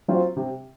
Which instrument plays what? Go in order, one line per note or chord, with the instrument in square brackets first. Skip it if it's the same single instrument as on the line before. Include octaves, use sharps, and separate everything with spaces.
[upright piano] F#3 C4 F4 C5
C3